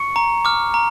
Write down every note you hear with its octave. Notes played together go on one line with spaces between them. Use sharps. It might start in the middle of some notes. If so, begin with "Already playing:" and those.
Already playing: C#6 C#7
A#5
D6 F6
A#5